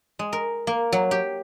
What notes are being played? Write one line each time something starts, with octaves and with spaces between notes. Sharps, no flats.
G#3
A#4
A#3
F#3
G4